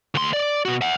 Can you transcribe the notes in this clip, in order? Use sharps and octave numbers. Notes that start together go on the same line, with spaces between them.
D2 C6
D5
B2 F#4
E5 F#5